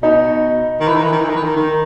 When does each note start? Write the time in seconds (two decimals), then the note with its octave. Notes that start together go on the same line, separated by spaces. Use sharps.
0.02 B2 D#4
0.80 D#3
0.88 E3
0.96 D#3
1.03 E3
1.12 D#3
1.20 E3
1.29 D#3
1.36 E3
1.44 D#3
1.56 D#3